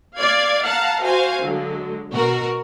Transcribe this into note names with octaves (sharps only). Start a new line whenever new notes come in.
D5 F5 G#6
F5 F#5 A5 A#5
F#4 C5 F5 G#5
D3 F#3 G#3
B2 F#4 A#4